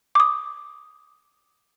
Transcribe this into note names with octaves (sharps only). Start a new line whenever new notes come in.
D6 D#6